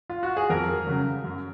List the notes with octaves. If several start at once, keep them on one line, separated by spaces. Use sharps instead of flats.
F4
F#4
G#4
F2 A#4
C#3 F#3
F#2